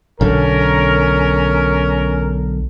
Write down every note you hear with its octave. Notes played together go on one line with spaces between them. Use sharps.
B1 D3 C#4 A#4